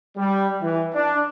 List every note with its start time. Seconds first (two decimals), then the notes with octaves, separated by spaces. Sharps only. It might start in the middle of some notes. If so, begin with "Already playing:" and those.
0.16 G3
0.61 E3
0.94 D4